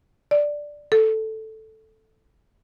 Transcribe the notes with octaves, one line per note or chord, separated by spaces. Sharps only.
D5
A4